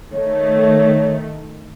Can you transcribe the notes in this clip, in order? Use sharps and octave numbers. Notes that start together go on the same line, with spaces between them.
D#3 A3 C#5